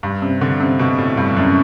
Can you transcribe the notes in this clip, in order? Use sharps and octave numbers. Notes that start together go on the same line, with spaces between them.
G2
C3
D3
C3
B2
A2
G2
F#2